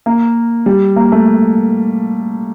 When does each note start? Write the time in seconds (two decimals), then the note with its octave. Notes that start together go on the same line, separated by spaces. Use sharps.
0.06 A#3
0.66 G3
0.96 A#3
1.12 A3